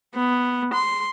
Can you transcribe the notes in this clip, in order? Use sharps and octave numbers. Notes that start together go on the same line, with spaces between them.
B3
C6